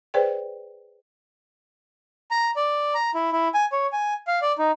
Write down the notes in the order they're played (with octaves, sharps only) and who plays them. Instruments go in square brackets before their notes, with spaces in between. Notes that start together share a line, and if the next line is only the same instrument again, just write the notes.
[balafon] G#4 B4 C5 D5 G5
[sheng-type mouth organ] A#5
D5
A#5
E4
E4
G#5
C#5
G#5
F5
D5
D#4